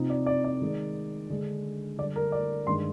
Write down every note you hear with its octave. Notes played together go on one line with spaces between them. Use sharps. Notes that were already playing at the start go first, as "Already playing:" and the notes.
Already playing: C3 F3 C4 D#4
D5
D5
D5
D#3 G#3 D#4
D3 G#3 D4
D3 G3 D4 D5
A#4
D5
G2 D#3 G#3 C6